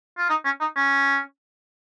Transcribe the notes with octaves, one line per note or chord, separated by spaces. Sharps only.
F4
D#4
C#4
D#4
C#4